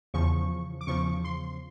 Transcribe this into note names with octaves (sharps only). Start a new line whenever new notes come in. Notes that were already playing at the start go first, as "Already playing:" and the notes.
E2 C#3 F3 C#6
D6
E2 C#3 F3 C#6
C6